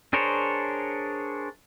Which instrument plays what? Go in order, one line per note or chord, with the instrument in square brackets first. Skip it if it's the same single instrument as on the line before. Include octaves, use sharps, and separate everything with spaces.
[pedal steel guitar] D4 G#4 A#4 C5 C#5